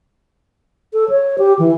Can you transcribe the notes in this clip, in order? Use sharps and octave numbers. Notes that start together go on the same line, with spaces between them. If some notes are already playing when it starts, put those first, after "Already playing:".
A4
C#5
G4
E3